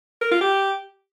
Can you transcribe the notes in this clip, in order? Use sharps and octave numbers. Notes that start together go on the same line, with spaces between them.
A#4
F4
G4